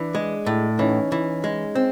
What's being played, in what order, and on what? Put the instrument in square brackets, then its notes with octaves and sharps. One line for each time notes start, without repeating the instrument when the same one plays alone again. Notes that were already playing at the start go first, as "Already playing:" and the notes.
Already playing: [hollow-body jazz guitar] E3 [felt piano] D4
[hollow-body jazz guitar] G#3
A2
[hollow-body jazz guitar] E3 [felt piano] C#4 D#4
[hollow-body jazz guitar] E3
G#3
C4